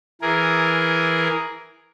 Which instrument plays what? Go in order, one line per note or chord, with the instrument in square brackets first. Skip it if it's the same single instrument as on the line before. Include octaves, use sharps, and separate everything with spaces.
[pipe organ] E3 G#4 A#4